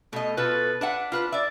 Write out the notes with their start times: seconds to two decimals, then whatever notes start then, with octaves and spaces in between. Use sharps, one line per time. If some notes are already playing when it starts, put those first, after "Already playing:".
0.13 B2 A3 D#5
0.37 B2 F4 A4 B4
0.81 D4 B4 E5 F#5
1.12 F4 B4 C5
1.32 D5 E5